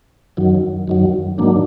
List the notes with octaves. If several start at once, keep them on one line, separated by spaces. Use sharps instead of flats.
F#2 D#3 F#3
F#2 D#3 F#3
G#2 D#3 F#3 A#3 D4